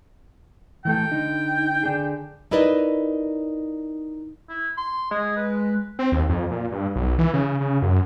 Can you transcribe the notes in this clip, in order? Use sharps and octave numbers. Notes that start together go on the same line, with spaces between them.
E3 A3 A4 G5
D3 D#4
D3 D4 G#4
D#4 E4 A#4 B4 D5 D#5
E4
C6
G#3 G#4
B4
C4
D#2
F2
A#2
G2
B1
E3
C#3
C#3
F#2